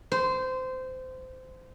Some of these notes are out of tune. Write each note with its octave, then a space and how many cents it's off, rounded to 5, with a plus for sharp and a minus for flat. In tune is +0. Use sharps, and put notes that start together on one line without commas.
C5 -20